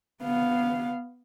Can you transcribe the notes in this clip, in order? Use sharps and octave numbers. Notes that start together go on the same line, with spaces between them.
B3 F5